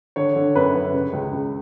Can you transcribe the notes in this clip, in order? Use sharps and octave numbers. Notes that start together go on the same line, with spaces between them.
D3 C#5
D3
F#2 B4
F#2
C#3
C#2
C#2